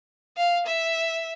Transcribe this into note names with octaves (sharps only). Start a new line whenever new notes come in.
F5
E5